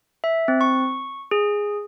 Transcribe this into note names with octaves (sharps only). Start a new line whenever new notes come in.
E5
C4
C#6
G#4